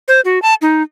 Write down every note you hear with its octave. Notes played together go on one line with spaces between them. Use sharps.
C5
F#4
A5
D#4